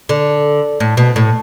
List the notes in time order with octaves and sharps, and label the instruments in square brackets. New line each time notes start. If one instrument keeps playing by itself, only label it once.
[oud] D3
A2
B2
A2